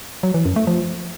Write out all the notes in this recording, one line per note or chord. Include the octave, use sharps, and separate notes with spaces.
F#3
E3
F#2
A3
F3